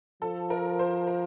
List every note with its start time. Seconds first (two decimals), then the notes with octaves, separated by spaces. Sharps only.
0.22 F3 A4
0.50 A#4
0.79 C5
1.07 A#4